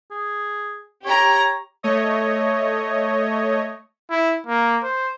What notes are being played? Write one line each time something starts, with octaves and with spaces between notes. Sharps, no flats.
G#4
G4 C#5 A#5
A3 C#5 D#5
E4
A#3
C5